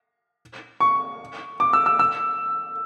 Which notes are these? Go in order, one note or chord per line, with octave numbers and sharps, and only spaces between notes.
C#6
D6
E6
E6
E6